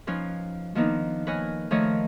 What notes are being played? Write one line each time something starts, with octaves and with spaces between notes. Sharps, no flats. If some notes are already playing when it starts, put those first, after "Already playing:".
F3 C#4 D#4 F4 B4
D#3 F3 A#3 B3 D4 D#4
B4 C#5 D#5 G#5 F6
D#3 F3 A3 C#5 D#5